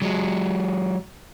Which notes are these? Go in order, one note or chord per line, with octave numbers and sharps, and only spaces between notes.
F#3 G#3